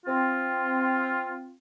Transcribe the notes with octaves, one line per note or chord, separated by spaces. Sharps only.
C4 F4